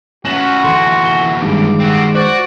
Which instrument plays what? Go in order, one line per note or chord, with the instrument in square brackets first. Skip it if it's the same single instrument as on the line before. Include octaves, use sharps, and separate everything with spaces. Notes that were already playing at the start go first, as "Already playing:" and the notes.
[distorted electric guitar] C#4 B4 [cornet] F#4 [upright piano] A#6 E7 F#7
[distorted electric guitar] D2 E3 [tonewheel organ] A4 [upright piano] C6
[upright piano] G7
[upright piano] G2 [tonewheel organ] D#3 G#3 D6
[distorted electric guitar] C4 F#4
[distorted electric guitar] F#4 [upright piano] C5 [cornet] D5